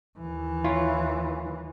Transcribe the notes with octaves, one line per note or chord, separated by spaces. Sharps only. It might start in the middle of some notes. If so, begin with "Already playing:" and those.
D#2 E3
E4 F4 C#5